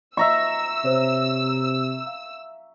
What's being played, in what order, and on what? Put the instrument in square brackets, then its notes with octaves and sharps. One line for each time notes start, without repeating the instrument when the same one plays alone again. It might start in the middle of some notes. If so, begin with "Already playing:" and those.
[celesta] D#5 [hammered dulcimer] E5 A#5 C#6 [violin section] E6
[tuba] C3 [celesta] C5 C#5
[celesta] F5